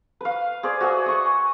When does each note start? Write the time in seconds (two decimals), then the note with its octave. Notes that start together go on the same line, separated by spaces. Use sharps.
0.21 B4 F5
0.63 G#4 C5 D5
0.81 F#4 G#4 E5
1.06 D#5 C#6